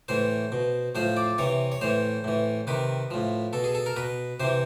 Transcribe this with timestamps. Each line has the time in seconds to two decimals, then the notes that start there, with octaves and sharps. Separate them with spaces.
0.08 A2 E3 C5
0.52 B2
0.95 A2 F3 C5
1.17 D5
1.38 C3 E3 C#5
1.72 C#5
1.81 A2 E3 C5
2.24 A2 E3
2.67 C3 D#3 B4
3.11 A2 F3
3.53 B2 A4
3.64 G#4
3.75 A4
3.86 A#4
3.97 B2 B4
4.40 C3 E3 C5